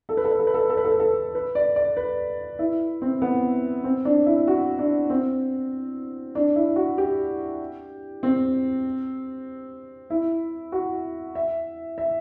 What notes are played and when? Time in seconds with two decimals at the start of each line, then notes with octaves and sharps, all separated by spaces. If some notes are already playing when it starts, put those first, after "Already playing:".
0.09 A4
0.17 B4
0.24 A4
0.31 B4
0.40 A4
0.47 B4
0.54 A4
0.61 B4
0.70 A4
0.77 B4
0.85 A4
0.92 B4
1.00 A4
1.35 B4
1.55 D5
1.76 D5
1.97 B4
2.59 E4
3.02 C4
3.22 B3
3.84 C4
4.05 D4
4.26 E4
4.48 F#4
4.79 D4
5.10 C4
6.35 D4
6.56 E4
6.76 F#4
6.98 G4
8.23 C4
10.10 E4
10.72 F#4
11.35 E5
11.98 E5